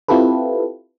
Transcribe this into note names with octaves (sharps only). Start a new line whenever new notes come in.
C4 E4 F4 G4 A4 B4